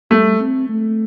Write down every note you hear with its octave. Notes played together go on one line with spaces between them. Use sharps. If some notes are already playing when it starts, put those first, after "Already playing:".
G3 A3
C4
A3